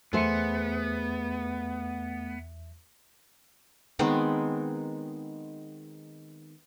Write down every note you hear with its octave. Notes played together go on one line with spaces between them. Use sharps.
E2 A3 B3 G#4 C5 E5 C#7
D#3 G#3 B3 C4